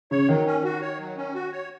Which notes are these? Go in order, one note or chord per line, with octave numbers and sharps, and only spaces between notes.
C#3 C#5
D#3 F#3
C#4
F#4
C#5
F#3
C#4
F#4
C#5